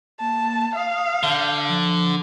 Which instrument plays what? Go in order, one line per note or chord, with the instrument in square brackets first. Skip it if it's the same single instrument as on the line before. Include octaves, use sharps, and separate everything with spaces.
[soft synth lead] A#3 [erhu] A5
[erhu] F5 [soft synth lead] D#6
[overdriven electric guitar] D3 [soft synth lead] G6
[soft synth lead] F3